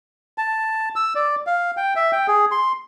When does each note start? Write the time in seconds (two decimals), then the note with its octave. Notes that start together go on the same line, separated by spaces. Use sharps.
0.38 A5
0.96 E6
1.15 D5
1.47 F5
1.77 G5
1.96 E5
2.12 G5
2.28 G#4
2.51 C6